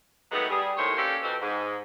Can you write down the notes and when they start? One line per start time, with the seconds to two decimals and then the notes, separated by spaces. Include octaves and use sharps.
0.31 D#3 F#3 G#3 A3 B3
0.50 G3 G#4
0.76 D#2 A2 E4 C5 C#5
0.97 A#3 C#4 D4 G4 A4 C5
1.23 F2 B2 C4
1.40 G#2